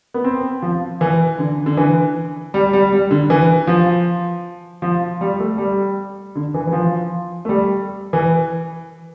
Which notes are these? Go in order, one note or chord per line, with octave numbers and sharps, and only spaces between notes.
B3
C4
F3
E3
D3
D3
E3
G3
G3
G3
D3
E3
F3
F3
G3
A3
G3
D3
E3
E3
F3
A3
G3
E3